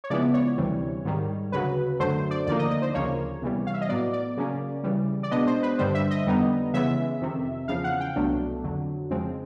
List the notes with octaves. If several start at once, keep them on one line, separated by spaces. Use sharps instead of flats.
C#5
C#3 F3 G#3 B3 E4 D5
C#5
D2 C3 E3 G3
G#2 D#3 G3
D2 C#3 F#3 B4
F#2 D3 F#3 A3 C5
D5
D#2 D3 F3 A#3 D#4 D5
D#5
D#5
C5
D2 C#3 F3 A#3 C#5
E2 C3 E3 G3
F5
E5
D#5
A2 F#3 B3 D5
D5
C#3 F#3 A#3 C#4
C#3 E3 G3
D5
B2 G#3 B3 D4 D#5
C5
B4
G2 D3 G3 C5
E5
D#5
F2 D3 G3 B3 D#4
C#3 E3 G#3 B3 E5
F2 C3 D#3
E2 C#3 F3 F5
F#5
G5
C2 B2 F#3 A3 D4
F2 D3 F#3
F2 C#3 F3 G#3 C4